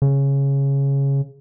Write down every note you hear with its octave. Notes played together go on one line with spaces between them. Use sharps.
C#3